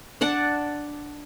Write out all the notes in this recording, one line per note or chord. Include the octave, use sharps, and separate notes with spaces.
D4 D5 F#5 A5